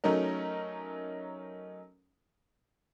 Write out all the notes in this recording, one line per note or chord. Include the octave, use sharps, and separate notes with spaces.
F#3 A3 C#4 D#4 A#4